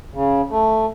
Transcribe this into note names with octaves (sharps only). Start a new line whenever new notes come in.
C#3
A3